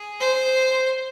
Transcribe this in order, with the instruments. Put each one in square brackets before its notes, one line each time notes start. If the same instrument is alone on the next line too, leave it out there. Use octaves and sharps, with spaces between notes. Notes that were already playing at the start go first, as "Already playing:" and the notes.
Already playing: [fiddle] G#4
C5